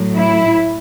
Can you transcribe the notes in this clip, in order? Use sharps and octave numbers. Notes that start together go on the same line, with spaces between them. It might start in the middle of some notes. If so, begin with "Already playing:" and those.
Already playing: A2 F#3
E4